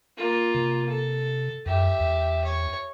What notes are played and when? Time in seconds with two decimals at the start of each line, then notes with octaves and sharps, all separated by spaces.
0.17 A#3 F4
0.55 C3
0.89 A4
1.66 F#2 G4 E5
1.99 E2
2.44 C#5